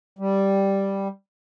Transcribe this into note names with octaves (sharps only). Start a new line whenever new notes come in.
G3